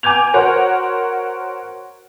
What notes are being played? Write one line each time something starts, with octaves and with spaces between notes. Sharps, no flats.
G#5 D6 G6 G#6 F7
F#4 A#4 C5 C#5 F#5